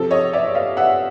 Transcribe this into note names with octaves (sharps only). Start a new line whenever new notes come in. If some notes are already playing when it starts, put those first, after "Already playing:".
Already playing: C3 F3 A4
C#5 D#5
D5 E5
D#5 F5
E5 F#5